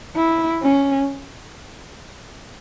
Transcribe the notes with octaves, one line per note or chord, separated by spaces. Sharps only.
E4
C#4